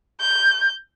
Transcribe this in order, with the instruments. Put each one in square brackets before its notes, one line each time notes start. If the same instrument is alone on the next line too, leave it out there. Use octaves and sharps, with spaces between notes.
[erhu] G6